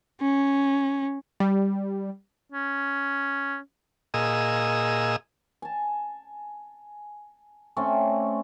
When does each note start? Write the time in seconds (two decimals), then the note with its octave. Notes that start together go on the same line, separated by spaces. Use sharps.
0.21 C#4
1.40 G3
2.52 C#4
4.14 A#2 G#4 D#5 E6
5.62 G#5 A5
7.77 A3 C4 C#4 D5